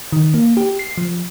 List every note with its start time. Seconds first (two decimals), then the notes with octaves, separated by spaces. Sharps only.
0.12 D#3
0.34 A#3
0.57 G4
0.79 C7
0.98 F3